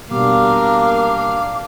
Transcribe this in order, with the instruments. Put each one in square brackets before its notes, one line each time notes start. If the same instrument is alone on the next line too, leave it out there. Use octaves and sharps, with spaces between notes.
[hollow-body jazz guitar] B2 G3 [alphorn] A#3 [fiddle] D4 F5 [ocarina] D6